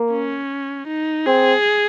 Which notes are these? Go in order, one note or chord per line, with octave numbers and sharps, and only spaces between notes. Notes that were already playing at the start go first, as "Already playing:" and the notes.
Already playing: A#3
C#4
D#4
C4 G#4